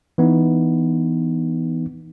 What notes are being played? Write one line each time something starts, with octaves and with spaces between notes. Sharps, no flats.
E3 B3 D#4